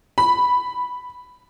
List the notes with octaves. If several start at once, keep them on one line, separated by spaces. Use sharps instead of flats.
B5